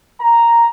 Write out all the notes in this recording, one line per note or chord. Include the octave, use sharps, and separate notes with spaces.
A#5